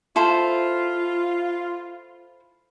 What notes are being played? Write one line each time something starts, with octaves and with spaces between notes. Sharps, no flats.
E4 F4 A4 C5